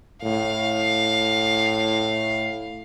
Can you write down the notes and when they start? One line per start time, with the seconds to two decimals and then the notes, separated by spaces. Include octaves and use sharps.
0.23 A2 F5